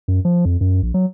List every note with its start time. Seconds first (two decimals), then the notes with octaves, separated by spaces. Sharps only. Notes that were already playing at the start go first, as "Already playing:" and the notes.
0.08 F#2
0.25 F3
0.45 F2
0.61 F#2
0.83 A#1
0.94 F#3